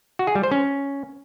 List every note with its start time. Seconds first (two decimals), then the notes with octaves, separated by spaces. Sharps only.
0.19 F#4
0.27 G#4
0.35 G3
0.43 C5
0.51 C#4